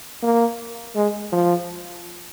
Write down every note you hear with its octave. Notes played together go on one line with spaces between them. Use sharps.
A#3
G#3
F3